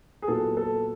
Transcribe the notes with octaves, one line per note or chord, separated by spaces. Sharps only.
G#4
A#2 F#3 B3 E4 A4
A4